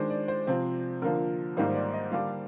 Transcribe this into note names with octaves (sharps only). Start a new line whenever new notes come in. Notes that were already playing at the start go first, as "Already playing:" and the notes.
Already playing: D#3 G#3 D4 C5
D5
C5
C3 F3 C4 C5
D3 F3 A#3 A#4
G#2 D#3 G3 A#3 D#4 C5
D5
D#5
D3 G3 A#3 D4 F5